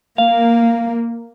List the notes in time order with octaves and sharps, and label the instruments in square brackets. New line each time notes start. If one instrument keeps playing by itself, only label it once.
[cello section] A#3 [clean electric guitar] F5